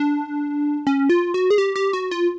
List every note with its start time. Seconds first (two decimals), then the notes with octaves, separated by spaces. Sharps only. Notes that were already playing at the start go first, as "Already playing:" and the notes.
Already playing: D4
0.87 C#4
1.10 F4
1.34 F#4
1.51 G#4
1.58 G4
1.76 G4
1.93 F#4
2.11 F4